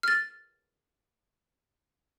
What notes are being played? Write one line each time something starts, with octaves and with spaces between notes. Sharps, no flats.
F6 A6